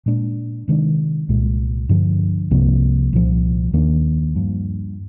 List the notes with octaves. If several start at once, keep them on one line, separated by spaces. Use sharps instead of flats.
A#2 G#3 D4
C3 D#3 G#3 D4
C2 A#2 G#3
G2 D3 F3
C2 C3 F3 A#3
C2 A#2 F3
D#2 D#3 A#3 D4
G2 F3 A#3